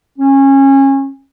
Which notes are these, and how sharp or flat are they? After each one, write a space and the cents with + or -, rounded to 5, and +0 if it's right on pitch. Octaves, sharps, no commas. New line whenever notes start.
C#4 -25